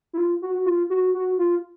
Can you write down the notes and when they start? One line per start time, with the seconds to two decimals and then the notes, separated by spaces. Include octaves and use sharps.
0.13 E4
0.18 F4
0.42 F#4
0.55 F#4
0.66 F4
0.90 F#4
1.14 F#4
1.38 F4